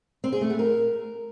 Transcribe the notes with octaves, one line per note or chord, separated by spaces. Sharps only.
C4
G#4
A3
B3
A#4